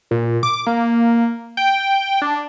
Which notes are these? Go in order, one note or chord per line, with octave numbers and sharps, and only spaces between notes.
A#2
D6
A#3
G5
D4